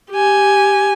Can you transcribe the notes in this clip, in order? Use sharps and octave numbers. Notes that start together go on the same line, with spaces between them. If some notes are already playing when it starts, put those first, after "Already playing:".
G4 G#5